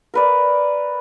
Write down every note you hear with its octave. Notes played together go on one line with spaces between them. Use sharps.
A#4 B4 D5